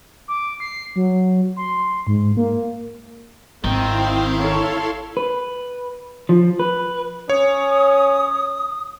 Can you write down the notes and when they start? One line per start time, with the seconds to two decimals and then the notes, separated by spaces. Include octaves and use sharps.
0.28 D6
0.60 C7
0.96 F#3
1.57 C6
2.07 G#2
2.37 A#3
3.64 G#1 D#3 C4 E4 F5 C6
4.38 A4 C#5
5.17 B4
6.29 F3
6.59 B4
7.29 C#4 C#5 D#6